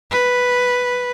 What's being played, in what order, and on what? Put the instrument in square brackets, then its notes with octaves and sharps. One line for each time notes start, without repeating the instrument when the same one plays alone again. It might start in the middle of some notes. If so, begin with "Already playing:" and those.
[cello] B4